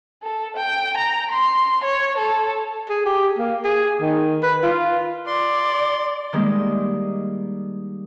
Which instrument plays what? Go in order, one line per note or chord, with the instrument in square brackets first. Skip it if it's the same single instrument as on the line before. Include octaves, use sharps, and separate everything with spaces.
[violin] A4
G5
A#5
C6
C#5
A4
[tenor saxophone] G#4
G4
A#3
G#4
D#3
B4
F4
[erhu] D5 [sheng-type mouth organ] C6
[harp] D#3 G3 G#3 A#3